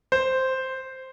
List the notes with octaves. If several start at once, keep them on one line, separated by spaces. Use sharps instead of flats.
C5